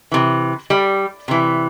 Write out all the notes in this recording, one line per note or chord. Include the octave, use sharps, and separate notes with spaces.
C3 E3
G3
C3 E3